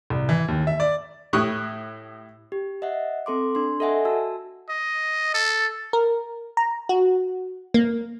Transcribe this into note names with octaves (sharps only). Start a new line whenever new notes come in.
C2
E3
D#2
E5
D5
A2 G4 C#6 D#6 F#6
G4
D#5 E5 F#5
C4 A4 C6 D6
D4 C6
A4 D#5 E5 F#5 G#5
F#4 A5 E6
D#5
A4
A#4
A#5
F#4
A#3